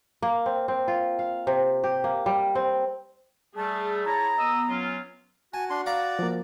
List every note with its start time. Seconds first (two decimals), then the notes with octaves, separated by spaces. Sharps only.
0.22 A#3
0.46 C4
0.68 C4
0.88 F4
1.19 F5
1.47 C3
1.84 G4
2.04 A#3
2.26 G3
2.55 C4
3.57 G3 A3 G#4 A5
4.06 E4 C#5 A5 A#5
4.37 B3 D#5 D#6 E6
4.68 F#3 C#4 F4
5.54 F#4 G#5 A5
5.70 D4 C6
5.86 D5 F5 A#5 B5
6.19 F3 A#3